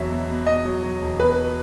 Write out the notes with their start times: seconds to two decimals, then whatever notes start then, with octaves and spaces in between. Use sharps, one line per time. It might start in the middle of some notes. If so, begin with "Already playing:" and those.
Already playing: E1 E2 F#3 E5
0.10 B2
0.28 B2
0.46 B2 D#5
0.65 F#3
0.83 F#3
1.02 E1
1.20 B2 B4